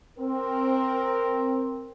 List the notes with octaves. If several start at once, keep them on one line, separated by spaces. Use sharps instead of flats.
C4 A#4